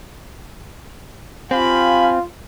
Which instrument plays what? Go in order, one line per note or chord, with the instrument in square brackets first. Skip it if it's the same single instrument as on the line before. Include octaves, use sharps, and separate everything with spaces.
[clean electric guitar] C4 [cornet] F4 [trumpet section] G4 G#5 B5 [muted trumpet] F5